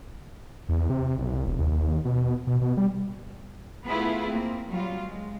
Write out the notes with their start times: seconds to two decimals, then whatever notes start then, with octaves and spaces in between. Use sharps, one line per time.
0.69 E2
0.90 C3
1.18 B1
1.32 C2
1.46 E1
1.59 D#2
1.71 D#2
2.05 B2
2.47 B2
2.61 B2
2.77 G3
3.87 A3 B3 E4 F4 G#4 B4
4.28 A#3 C4
4.68 F#3 G3 F4 F5
5.05 G#3